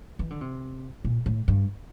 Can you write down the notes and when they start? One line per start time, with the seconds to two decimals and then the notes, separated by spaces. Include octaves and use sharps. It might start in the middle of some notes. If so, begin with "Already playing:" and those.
0.19 E3
0.30 D3
0.41 C3
1.05 A#2
1.26 A2
1.48 G2